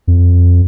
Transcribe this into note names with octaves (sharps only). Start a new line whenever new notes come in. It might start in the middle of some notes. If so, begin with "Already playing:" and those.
F2